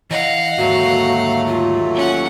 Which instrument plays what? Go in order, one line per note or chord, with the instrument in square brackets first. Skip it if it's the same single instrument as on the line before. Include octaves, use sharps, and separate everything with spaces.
[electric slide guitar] E3 [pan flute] D#5 [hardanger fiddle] F5 F#5
[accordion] D#2 F#3 A3 [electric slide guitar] G#2 D3 A#3 [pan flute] F#4
[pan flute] F4
[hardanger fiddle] C#4 F#5